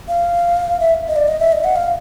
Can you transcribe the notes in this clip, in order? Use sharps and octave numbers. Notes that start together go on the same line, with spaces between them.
F5
E5
D#5
D5
D#5
E5
D#5
F#5
F5